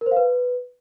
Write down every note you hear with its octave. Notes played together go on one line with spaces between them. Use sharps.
A#4
C5
F5
B4